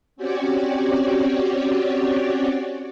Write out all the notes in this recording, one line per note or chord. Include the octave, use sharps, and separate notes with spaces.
C4 C#4 F#4 G4 C#5 D5